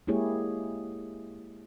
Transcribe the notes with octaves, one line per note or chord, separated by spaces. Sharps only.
G#3 A#3 E4 G4 G#4 C#5